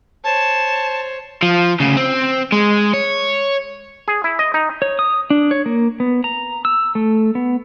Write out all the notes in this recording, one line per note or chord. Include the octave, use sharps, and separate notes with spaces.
C5 C#5 A5
F3
D2 C#3
C4
G#3
C#5
G#4
E4
D#5
D#4
C#5
D#6
D4
C#5
A#3
B3
A#5
E6
A3
B3